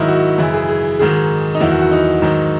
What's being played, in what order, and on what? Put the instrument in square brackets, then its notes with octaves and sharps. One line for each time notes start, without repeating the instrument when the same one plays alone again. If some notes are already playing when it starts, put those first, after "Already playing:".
Already playing: [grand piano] G#2 D#3 F#3 E4 D#5
F#4
F#2 C#3 E3 E4
G#4
G#4
G#2 D#3 F#3 G#4
D#4
E2 D#3 F#3 E4
F#4
F#4
D#4
G#2 D#3 F#3